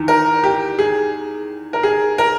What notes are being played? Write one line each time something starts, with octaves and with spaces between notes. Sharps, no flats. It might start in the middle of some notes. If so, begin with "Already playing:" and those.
Already playing: E2 D#3
A#4
G4
G#4
A#4
G#4
A#4